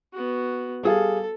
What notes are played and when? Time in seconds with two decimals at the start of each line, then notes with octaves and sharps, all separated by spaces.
0.13 B3 F#4
0.83 G3 G#4 A4 F5